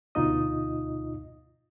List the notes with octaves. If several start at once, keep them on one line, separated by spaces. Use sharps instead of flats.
D2 B2 D#4 F4 D#5 D#6